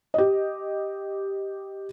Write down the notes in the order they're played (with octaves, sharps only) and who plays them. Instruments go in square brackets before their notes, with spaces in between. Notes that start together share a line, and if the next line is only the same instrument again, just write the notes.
[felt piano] G4 D#5